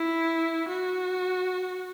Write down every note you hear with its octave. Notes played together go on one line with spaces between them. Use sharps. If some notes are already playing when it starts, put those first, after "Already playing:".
Already playing: E4
F#4